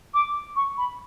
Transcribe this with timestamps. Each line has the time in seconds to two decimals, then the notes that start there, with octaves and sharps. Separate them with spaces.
0.14 D6
0.56 C#6
0.78 B5